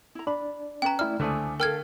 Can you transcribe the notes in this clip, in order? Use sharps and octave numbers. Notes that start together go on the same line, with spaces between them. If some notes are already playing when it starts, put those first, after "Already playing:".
E4 A#5
D4 D5 B5
C#4 B4 G5 A#5
A3 E4 D5 F6
C#2 D3 A3 C5 D5 G#5 D6 D#6
A4 A#4 F5 G5 F6 G#6